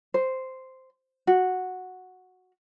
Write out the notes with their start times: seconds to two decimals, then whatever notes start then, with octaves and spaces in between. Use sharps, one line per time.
0.14 C5
1.27 F#4